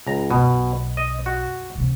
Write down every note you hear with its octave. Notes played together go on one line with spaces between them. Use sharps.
C#2 A#5
B1 F#2 B2
D#5
F#4
C3 E3